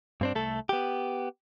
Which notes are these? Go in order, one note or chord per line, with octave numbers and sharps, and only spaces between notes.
G2 C4 D4
C2 A3 A4
B3 G4